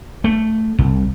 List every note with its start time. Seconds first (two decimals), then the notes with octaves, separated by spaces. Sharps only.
0.24 A3
0.79 C2